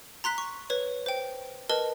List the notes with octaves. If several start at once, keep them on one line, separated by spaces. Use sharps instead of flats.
A#5 C6 F#6 B6
C#6
B4 C#5
C5 G5
A#4 B4 D#5 A5